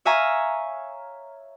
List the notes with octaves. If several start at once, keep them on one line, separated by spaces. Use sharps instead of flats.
C#5 E5 F5 G#5 A#5 C#6